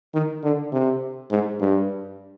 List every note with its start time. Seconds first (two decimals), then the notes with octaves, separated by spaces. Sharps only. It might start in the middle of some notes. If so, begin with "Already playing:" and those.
0.14 D#3
0.43 D3
0.73 C3
1.31 G#2
1.60 G2